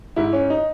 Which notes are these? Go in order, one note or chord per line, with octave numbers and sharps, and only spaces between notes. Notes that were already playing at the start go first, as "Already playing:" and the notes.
G#2 E4
C#4
D#4